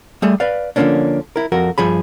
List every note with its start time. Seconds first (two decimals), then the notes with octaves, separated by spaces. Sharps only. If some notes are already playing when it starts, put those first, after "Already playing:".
0.22 G3 A3 G#4
0.40 B4 D5 F5
0.76 D3 F3 F#3 A#3 C#4 D4
1.36 E4 A#4
1.52 F2 F#4 A#4
1.78 G2 F3 G#4 B5